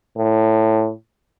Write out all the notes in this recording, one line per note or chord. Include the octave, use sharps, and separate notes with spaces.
A2